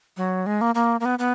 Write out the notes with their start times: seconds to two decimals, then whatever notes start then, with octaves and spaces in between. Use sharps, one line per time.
0.17 F#3
0.46 G#3
0.61 A#3
0.75 A#3
1.00 A#3
1.05 B3
1.19 B3